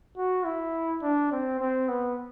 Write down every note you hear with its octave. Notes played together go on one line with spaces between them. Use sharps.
F#4
E4
D4
C4
C4
B3